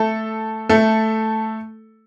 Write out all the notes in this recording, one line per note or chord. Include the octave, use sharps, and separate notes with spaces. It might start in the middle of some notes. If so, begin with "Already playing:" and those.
Already playing: A3 A4
A3 A4